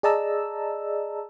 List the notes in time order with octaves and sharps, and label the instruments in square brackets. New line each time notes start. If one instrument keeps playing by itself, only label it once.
[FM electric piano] G#4 D5 D#5 A5 A#5 E6